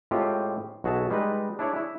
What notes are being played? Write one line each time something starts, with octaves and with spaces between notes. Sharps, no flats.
A2 G#3 C4 F4 G4
B1 F#4 G#4 E5 A5
G3 G#3 D#4 B4
D4 E4 G#4 C#5 D5
E4